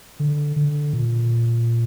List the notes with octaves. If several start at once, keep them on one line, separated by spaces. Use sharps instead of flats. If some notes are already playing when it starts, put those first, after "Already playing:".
D3
D3
A#2